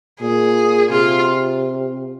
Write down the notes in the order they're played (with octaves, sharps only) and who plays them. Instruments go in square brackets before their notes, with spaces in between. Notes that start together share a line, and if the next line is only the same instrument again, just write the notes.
[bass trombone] A#2 [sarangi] G#4
[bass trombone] C3 [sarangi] F4